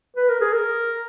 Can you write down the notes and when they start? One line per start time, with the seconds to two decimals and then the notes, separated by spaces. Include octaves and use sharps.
0.17 B4
0.29 A#4
0.41 G#4
0.53 A#4